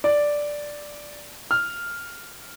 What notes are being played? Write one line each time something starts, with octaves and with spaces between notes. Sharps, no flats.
D5
F6